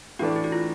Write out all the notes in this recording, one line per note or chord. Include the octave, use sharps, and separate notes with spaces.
A2 E3 A3 D4 F#4
E4
F#4
F4